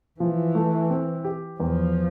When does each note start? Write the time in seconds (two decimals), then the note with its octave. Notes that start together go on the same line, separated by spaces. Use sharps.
0.20 E3 F3
0.55 A3
0.90 C4
1.24 G4
1.60 E2 F3